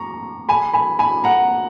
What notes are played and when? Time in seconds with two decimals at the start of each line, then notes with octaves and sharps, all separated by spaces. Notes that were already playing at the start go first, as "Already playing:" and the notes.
Already playing: A#5 C#6
0.49 G#5 B5
0.73 G#5 B5
0.99 G#5 B5
1.24 F#5 A#5